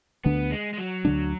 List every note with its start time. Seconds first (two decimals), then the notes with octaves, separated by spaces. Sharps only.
0.25 D2 D3 A3 B3 D4
0.51 G#3
0.73 G#3
0.78 F#3
1.05 D2 D3 A3 D4